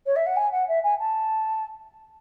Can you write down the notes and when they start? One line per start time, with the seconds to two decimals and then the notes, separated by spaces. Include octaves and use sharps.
0.06 C#5
0.16 E5
0.26 F#5
0.36 G#5
0.52 F#5
0.68 E5
0.83 G#5
0.99 A5